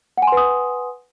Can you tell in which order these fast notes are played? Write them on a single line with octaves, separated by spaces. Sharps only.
F#5 G#5 C6 B4 D#6